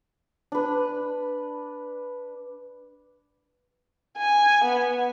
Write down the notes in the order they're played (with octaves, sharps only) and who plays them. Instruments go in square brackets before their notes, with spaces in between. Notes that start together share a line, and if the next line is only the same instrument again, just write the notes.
[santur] D4 B4
[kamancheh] G#5
B3